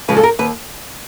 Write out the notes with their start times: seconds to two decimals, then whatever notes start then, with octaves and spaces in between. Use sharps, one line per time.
0.08 C#3 F3 G#3 B4
0.17 A4
0.23 A#4
0.39 D#2 B4